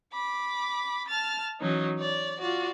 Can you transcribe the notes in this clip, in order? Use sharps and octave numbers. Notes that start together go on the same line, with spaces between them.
B5 D6
A5 F6 A6
E3 F#3 C#4 D#4
C#5 D5
F4 F#4 D5